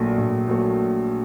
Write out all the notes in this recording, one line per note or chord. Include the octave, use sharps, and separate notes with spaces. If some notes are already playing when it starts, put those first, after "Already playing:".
Already playing: A#1 A#2 F#3 A3
A#1
A#2 F#3 A3